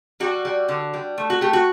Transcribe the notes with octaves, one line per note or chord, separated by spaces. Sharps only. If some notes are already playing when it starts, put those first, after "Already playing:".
G3 F#4
G3
D3
G3
A3
F#4
A3 G4
F#4